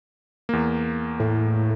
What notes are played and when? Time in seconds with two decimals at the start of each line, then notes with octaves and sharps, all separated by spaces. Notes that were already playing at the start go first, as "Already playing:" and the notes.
0.49 E2 A#3
1.20 A2